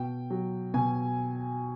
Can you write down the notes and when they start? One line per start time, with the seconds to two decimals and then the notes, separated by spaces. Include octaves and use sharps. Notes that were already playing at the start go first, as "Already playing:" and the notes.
Already playing: B2 G5
0.30 F#3
0.74 B2 G#5